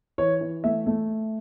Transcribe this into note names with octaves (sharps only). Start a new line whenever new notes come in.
E3 C#5
E3
A3 E5
A3